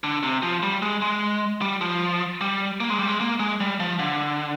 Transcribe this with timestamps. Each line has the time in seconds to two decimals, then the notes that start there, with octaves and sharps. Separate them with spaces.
0.04 D3
0.23 C3
0.43 F3
0.63 G3
0.82 G#3
1.02 G#3
1.61 G3
1.81 F3
2.41 G3
2.80 A#3
2.90 G#3
2.99 G3
3.08 G#3
3.20 A#3
3.40 G#3
3.60 G3
3.80 F3
3.99 D3